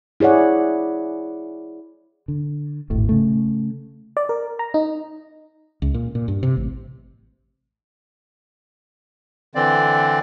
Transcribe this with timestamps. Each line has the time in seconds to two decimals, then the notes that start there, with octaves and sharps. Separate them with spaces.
0.20 E4 G#4 C#5 D5 F#5
2.28 D3
2.90 D#1 G#1 A2 A3
3.09 C#3 A3
4.17 D5
4.29 A#4
4.59 A#5
4.74 D#4
5.82 C#2
5.94 A#2
6.15 A#2
6.28 G2
6.43 C3
6.57 A1
9.55 D3 E3 C4 D5